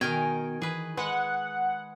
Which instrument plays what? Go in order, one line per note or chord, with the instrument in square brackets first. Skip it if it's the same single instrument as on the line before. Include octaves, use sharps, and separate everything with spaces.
[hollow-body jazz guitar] B2 [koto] D#3 A#4 G5 [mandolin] G#5
[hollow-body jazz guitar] E3 [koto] G#4 B4
[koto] G#3 [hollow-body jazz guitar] B4 [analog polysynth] F#5